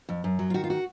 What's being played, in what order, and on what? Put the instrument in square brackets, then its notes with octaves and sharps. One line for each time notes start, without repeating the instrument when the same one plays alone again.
[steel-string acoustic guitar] F2
F#2
F#3
F4
D#3 F#4
F4
F#4